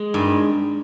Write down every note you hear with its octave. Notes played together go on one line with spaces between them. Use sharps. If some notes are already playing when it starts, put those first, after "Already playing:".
Already playing: G#3
G2 D#3